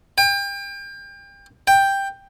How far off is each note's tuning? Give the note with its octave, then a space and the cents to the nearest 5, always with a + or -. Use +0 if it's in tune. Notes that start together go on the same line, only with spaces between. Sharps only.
G5 +30
G5 +5